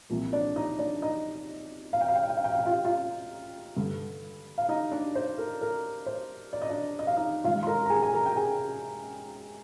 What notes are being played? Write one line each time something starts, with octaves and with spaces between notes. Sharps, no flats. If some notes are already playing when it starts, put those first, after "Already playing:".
C2 A#2 F3 A#3
D4 D5
D#4 D#5
D4 D5
D#4 D#5
F5
G5
F5
G5
F5
G5
F5
G5
F5
G5
F4 F5
F4 F5
G2 D3 G3
F5
D#4 D#5
D4 D5
C5
A#4
A#4
C5
D5
D#5
D4 D5
D#5
F5
D#4 D#5
G#2 D#3 G3 F4 F5
C6
A#4 A#5
A#5
G#4 G#5
G#5
A#4 A#5
G5
G#4 G#5